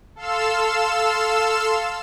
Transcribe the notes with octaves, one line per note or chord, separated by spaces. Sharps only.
A4 F5 C6 E6 E7